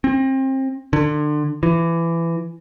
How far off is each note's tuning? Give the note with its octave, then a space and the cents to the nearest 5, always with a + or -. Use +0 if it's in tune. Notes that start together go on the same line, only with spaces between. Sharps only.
C4 +30
D3 +30
E3 +20